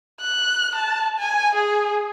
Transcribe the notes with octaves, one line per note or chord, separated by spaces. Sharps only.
F#6
A5
G#5
G#4